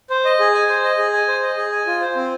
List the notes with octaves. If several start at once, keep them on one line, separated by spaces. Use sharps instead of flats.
C5
D#5
G#4
G#5
C5
D#5
G#4
G#5
C5
D#5
G#4
G#5
F4
C5
C4